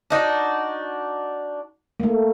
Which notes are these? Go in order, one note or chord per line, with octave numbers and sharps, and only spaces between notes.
D4 D#4 F#4
A3 A#3